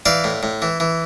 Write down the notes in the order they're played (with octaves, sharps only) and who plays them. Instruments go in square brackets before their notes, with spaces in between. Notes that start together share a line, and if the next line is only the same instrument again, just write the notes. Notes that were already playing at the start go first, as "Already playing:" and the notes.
[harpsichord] E3 D5 F5
A2
A2
E3
E3